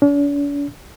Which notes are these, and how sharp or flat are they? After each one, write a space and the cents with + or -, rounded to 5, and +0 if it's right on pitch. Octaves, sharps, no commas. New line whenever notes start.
D4 -45